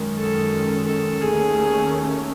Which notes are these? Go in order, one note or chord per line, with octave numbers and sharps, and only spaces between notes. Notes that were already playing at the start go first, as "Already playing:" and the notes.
Already playing: F#2 D#3 G#3 C#4
A4
A4
D#2 D#3 A3 C#4 G#4